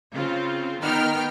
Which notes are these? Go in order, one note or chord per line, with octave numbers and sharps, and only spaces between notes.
C#3 C4 F4
D#3 B3 D#4 G5 F6